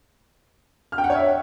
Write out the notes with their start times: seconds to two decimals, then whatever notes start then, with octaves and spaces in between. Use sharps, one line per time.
0.92 F6
0.98 G5
1.04 F#5
1.10 C#5
1.16 E5